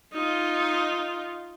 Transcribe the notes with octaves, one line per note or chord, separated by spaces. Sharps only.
D#4 F4